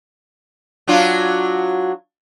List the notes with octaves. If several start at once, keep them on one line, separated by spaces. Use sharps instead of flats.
F#3 D4 F4